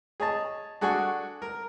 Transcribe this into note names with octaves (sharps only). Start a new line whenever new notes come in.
G#4 C#5 D#5 A5
D4 F#4 G#4 A4 C#6
A#4